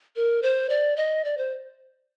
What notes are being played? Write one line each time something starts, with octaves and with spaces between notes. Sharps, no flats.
A#4
C5
D5
D#5
D5
C5